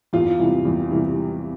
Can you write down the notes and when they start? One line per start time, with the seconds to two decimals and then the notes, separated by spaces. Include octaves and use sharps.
0.13 E2 F4
0.39 C3 E3 G3
0.65 E2
0.91 C3 E3 G3